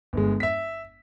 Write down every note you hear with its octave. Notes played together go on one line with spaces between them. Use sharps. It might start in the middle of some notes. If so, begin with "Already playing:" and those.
G1 G#3
E5 B6